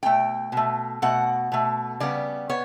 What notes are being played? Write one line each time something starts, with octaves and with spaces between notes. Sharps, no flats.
B2 A3 G5
B2 A3
B2 A3 F#5
B2 A3
C#3 G3 B3 D5
B3 C#5